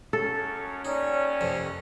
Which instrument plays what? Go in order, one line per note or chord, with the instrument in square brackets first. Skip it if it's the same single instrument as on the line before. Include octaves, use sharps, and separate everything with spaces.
[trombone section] F#2 C#4 [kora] A4
[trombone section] D#2 C#4 [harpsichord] D#4 [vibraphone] C#5 D5 A5
[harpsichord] F2 C3